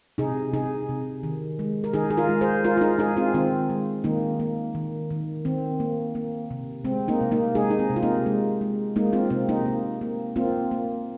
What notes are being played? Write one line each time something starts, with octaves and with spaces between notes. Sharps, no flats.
C3 D#4 G#4
C3 D#4 G#4
C3
D#3
G#3
A#4
D#3 D#4 G#4
G#4
F4 A#4
G#3
G#4 C5
G#3 F4 A#4
F4
D#4 G#4
G#3 D#4 G#4
C4 F4
D#3 C4 F4
G#3
D#3 A#3 D#4
A#3
D#3
D#3
D#3 C4
A#3
A#3
C3
G#3 C4
A#3 D#4
C3
A#3 D#4
G#3 D#4 G#4
D#4
C4
C3
F4
A#3 D#4
G#3
G#3
G#3 A#3 D#4
C4 F4
C3 C4
A#3 D#4
A#3
A#3
A#3 C4 F4
A#3